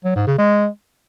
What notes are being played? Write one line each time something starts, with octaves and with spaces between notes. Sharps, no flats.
F#3
G#2
C#3
G#3